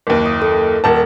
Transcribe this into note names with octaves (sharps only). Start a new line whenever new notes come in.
F#1 D#2
D#6
A4
D#1 A#4 A5